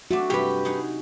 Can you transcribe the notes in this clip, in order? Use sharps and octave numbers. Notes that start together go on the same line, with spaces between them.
A3 C4 D4 F#4
G2 C3 G3 G4 B4
D#4 G#4 F#5